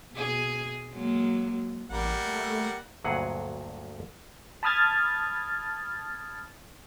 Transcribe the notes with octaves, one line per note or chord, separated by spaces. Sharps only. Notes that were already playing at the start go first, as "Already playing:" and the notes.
B2 G#4
F#3 G#3 A#3
A1 G3 A#3 F#5
A3
D2 G2 A#2 F#3 G#4 F#5
A5 B5 D#6 F6 G#6 A6